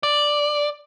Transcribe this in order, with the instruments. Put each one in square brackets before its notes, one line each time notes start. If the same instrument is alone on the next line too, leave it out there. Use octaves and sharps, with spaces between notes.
[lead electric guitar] D5